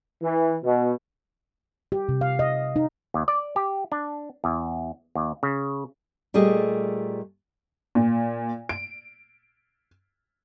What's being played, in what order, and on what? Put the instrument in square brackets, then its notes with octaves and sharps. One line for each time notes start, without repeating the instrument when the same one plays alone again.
[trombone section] E3
B2
[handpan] G4
C3
F5
D#5
D#4
[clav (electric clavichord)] D#2
D5
G4
D4
E2
D#2
C#3
[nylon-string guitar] A#2 G3 A3 G#4 D#5
[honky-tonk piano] A#2
D7